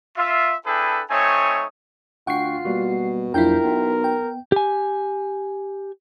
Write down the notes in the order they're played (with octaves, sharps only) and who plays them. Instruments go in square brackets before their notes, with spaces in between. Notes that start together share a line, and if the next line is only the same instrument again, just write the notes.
[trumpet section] F4 E5
D4 E4 G#4 A4 B4 G5
A3 C4 D#4 C#5 G#5 D#6
[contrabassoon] D2 [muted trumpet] F4 [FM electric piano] F#5 C7 [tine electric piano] G5 C#6
[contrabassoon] B2 [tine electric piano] G3 A#3 F#4
[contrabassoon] A#1 [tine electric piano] F2 F#3 G6 [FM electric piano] E4 F4 G5 [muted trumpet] A#4
[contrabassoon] B1 [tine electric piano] B3
[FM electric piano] G5
[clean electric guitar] G4 G#5